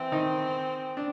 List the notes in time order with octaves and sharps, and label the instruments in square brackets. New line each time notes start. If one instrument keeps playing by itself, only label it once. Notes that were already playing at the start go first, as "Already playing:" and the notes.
Already playing: [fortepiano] E3 E4 [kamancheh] C4
[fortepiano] D#3 D#4
D4